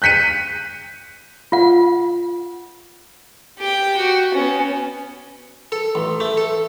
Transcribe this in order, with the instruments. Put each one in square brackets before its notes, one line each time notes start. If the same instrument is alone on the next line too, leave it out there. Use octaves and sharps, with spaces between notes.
[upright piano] F#6 G6 B6 C#7 D#7
[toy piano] F4 F#5
[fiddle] G4 G5
F#4
B3 C#4
[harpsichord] A4
A1
A3
A4